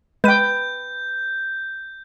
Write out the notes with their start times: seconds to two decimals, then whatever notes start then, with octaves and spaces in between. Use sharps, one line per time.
0.24 G#3 B4 G5 G6 D#7